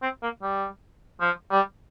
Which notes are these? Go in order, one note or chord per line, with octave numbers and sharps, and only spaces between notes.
C4
A#3
G3
F3
G3